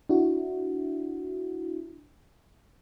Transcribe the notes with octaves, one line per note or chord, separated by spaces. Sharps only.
D4 E4 F#4